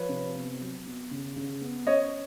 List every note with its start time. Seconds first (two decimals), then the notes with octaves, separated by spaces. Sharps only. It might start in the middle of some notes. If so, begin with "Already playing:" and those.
Already playing: F3 B4 C#5
0.09 C3
0.35 B3
0.61 F#3
0.85 B3
1.11 C#3
1.36 C#3
1.61 B3
1.87 C#4 C#5 D#5